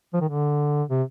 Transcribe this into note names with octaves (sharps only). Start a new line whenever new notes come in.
F3
D#3
D3
C3